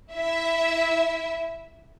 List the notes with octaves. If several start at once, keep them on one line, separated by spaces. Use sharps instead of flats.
E4 E5